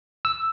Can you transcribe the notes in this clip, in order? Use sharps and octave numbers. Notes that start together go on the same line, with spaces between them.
E6